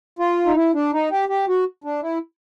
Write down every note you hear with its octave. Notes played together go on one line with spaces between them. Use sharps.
F4
D#4
E4
D4
D#4
G4
G4
F#4
D4
E4